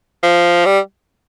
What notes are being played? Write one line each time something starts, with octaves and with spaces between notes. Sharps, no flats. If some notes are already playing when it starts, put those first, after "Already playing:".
F3
G3